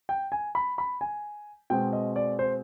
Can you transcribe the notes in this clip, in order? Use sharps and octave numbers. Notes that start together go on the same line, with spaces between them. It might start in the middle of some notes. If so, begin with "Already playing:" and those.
G5
G#5
B5
B5
G#5
B2 G#3 C4 G5
D#5
D5
C5